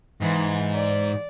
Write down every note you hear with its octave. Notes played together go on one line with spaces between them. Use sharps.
G#2 E3
D5